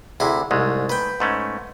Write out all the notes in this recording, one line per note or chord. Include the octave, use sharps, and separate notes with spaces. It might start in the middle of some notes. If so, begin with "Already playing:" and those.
D2 C3 E4 G#4
C2 G#2 G#3 A3
B4 G5
G#2 A3 C#4